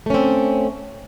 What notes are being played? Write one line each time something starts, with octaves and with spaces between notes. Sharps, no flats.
A3 C4 C#4